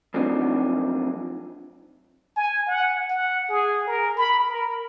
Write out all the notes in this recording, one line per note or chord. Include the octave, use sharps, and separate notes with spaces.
F#2 F3 C4 D4 D#4
G#5
F#5
F#5
G#4
A#4
B5
A#4